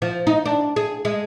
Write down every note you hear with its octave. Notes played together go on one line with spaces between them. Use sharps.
F3
D#4
D4
G#4
G#3